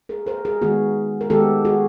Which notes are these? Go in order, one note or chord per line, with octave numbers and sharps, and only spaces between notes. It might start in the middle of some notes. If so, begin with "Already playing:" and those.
G#4 A#4
A#4 C5
G#4 A#4
D#3 G#3 B3 F#4 G#4
A#4
D#3 G#3 B3 G4 A4
F#4 G#4